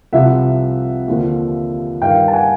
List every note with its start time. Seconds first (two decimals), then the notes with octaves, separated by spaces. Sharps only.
0.13 C2 C3 F3 E5 F#5
1.08 D#2 D3 F3
2.02 G2 D#3 F5 G5
2.28 A5
2.33 F#5 G#5